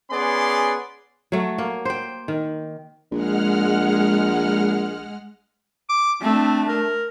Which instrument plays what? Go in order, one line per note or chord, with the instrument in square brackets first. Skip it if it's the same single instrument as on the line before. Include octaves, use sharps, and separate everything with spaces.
[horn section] B3 C#4 G#4 D5 C6
[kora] F#3 A3
A#3
C5 G5
D#3
[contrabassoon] A#1 [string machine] G#3 F#5 F6
[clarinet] D6
[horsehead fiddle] A3 D4 [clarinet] C4
[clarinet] A#4